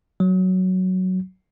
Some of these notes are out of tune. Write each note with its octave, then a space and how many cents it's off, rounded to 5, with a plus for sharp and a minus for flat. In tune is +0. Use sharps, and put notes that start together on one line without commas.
F#3 +5